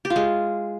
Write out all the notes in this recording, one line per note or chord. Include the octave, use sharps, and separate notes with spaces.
G4
F4
G#3